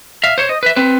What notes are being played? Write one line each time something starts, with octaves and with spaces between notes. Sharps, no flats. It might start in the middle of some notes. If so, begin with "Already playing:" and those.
E5 F5
C5 C#5
D#5
B4 E5
C4 B4